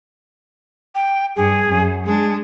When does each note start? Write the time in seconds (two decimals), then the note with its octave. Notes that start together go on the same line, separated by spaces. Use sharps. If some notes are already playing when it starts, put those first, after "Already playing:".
0.95 G5
1.36 G2 G#4
1.69 F#2
2.06 G#3 D4 G#4